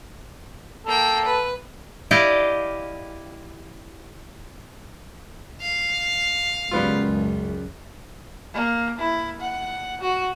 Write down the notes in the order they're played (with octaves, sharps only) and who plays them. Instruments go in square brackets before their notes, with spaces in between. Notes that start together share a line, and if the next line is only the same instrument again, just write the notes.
[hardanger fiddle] A#3 G5 [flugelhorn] A4
[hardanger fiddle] B4
[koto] E4 G4 D5 D#5 F5
[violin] F5
[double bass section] C#2 F#2 [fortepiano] G3 B3 F4
[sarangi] A#3
E4
F#5
F#4